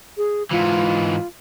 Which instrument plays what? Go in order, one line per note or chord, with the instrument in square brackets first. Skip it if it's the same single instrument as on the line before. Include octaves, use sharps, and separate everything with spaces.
[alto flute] G#4
[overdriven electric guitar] G#2 E3 [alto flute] F4